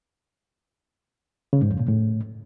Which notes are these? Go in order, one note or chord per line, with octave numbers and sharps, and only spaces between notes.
C#3
G#2
F2
A#2
A2